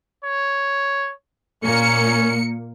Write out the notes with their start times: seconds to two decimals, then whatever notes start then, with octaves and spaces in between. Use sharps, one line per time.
0.25 C#5
1.64 A#2 A#3 C#4 C#7